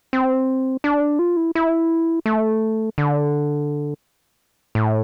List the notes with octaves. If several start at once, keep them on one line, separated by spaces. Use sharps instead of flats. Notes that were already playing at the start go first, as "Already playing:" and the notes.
C4
D4
F4
E4
E4
A3
D3
A2